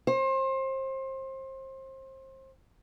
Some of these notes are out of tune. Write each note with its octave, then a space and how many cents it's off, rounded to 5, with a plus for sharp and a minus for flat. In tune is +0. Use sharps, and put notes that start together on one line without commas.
C5 +30